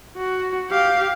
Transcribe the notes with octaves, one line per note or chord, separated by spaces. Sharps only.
F#4
G4 F5